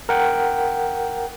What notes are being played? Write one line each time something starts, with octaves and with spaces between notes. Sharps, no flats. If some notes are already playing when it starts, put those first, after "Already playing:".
A#4 F#5 G5